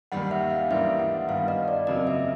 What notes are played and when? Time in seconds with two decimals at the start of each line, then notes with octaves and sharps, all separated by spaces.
0.12 D#2 D#3 G3 F#5
0.31 E5
0.50 F5
0.70 G#2 E3 G3 A#3 D4 E5
0.99 F#5
1.29 G2 D#3 G3 B3 F5
1.48 D#5
1.68 D5
1.87 F2 C#3 F#3 A#3 D#5
2.07 E5